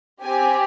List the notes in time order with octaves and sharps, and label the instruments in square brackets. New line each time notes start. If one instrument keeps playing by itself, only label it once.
[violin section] C4 G4 G#5